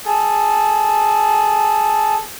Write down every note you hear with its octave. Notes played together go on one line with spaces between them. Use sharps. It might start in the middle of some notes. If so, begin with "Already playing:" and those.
G#4 A4